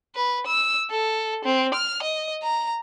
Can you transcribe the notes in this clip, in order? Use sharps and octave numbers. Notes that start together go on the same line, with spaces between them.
B4
E6
A4
C4
F6
D#5
A#5